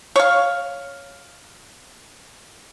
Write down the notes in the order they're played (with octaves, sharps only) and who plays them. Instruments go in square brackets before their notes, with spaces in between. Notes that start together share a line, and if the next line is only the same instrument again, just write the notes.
[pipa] C#5 F5